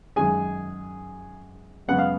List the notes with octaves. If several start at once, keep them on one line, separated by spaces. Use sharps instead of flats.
F#2 D#3 G#3 G#4 G#5
F#2 C#3 G#3 B3 F#5
F5